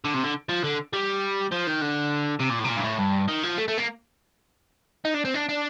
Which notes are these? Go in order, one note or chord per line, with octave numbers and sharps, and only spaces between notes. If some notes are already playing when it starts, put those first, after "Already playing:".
D3
C3
D3
F3
D3
G3
F3
D#3
D3
C3
A#2
A2
C3
A#2
G2
A2
G2
D#3
F3
A3
A3
A#3
D#4
D4
C4
D4
D4